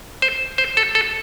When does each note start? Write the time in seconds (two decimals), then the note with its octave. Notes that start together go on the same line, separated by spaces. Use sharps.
0.22 C5
0.58 C5
0.77 A4
0.95 A4